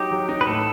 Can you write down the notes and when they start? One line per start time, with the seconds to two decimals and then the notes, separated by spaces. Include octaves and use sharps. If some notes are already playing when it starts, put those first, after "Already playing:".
Already playing: F#3 D#4 G4
0.11 F#3
0.29 D#4
0.41 B4
0.46 A2 A4